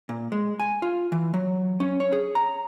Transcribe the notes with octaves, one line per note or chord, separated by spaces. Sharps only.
A#2
G#3
G#5
F4
E3
F#3
C#4
C#5
G#4
A#5